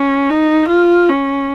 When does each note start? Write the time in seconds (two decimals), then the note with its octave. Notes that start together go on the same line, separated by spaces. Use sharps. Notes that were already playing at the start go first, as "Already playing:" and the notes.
Already playing: C#4
0.30 D#4
0.69 F4
1.09 C#4